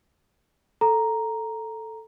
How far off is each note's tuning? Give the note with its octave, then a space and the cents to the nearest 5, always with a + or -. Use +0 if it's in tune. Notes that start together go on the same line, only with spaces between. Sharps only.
A4 +0 A#5 +0